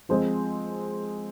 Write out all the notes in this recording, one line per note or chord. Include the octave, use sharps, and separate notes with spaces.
F3 G#3 C4 C5